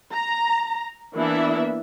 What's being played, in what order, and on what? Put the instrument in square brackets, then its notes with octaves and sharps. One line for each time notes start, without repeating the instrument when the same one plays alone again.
[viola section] A#5
E3 A#3 B3 D4 E4 E5